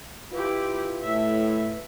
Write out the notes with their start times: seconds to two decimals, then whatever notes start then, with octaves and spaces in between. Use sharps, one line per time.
0.33 E4 F4 G4 B4
1.03 A2 E5